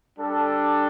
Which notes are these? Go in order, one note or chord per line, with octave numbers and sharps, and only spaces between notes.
G3 D4 A4